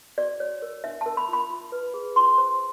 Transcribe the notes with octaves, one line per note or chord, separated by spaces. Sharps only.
F#4 D5
C#5
A#4
D4 E5
A#4 A5
B5
F4
B5
F4
B4
G#4
F4 C6
C5